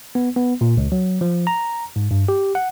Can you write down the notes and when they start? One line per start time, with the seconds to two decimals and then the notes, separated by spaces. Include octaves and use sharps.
0.15 B3
0.36 B3
0.61 A#2
0.77 C#2
0.92 F#3
1.21 F3
1.47 A#5
1.96 G#2
2.11 G2
2.28 G4
2.55 F#5